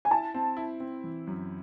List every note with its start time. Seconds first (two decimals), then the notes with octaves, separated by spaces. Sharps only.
0.05 G#5
0.11 E4 A5
0.34 C4
0.57 E4
0.80 C4
1.04 E3
1.27 F#2